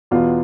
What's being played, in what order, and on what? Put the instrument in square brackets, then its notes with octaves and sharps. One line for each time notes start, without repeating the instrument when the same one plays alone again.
[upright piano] E2 B2 B3 F4